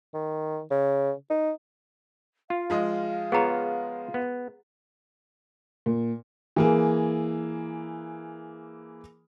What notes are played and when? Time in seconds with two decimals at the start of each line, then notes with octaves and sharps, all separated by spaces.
0.14 D#3
0.71 C#3
1.30 D#4
2.50 F4 F5
2.70 F3 G#3 D#5
3.32 B3 F4 G#4 C#5 A#5
4.14 B3
5.86 A#2
6.56 E3 A#3 G#4